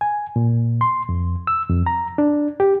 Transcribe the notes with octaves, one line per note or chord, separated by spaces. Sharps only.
G#5
A#2
C6
F2
E6
F2
A#5
D4
G4